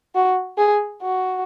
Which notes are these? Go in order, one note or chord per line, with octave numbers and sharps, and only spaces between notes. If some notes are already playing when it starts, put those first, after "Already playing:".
F#4
G#4
F#4